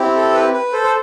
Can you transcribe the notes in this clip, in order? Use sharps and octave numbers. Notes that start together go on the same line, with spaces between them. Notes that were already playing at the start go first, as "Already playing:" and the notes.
Already playing: C4 E4 G4
A4
B4
B4
A4 C5
C5